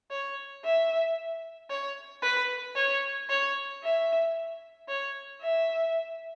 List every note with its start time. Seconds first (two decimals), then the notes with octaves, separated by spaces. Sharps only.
0.11 C#5
0.64 E5
1.70 C#5
2.23 B4
2.76 C#5
3.30 C#5
3.83 E5
4.89 C#5
5.42 E5